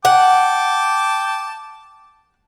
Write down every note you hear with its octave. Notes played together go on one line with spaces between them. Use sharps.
F#5 G5 A5 D6